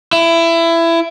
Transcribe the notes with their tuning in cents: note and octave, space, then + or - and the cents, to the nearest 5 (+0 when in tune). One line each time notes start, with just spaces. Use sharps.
E4 +20